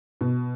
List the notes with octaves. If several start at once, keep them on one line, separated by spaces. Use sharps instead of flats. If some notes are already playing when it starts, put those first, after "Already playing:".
B2